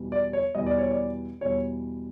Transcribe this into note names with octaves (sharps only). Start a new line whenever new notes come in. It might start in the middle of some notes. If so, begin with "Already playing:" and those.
Already playing: E2 B2 G3
D5
C#5
E2 B2 G3 D#5
D5
C#5
D5
E2 B2 G3 C#5